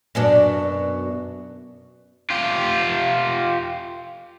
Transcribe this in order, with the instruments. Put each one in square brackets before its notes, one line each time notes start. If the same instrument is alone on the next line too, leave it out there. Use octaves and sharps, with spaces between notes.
[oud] F#2 B2 D4
[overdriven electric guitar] F4 G4